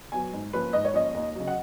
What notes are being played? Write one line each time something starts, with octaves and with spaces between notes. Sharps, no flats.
F#3 B3 G#5
G#2
F3 A#3 C#4 B4
G#2 D#5
C#5
F3 A#3 C#4 D#5
D#2
C#3 F#3
F#5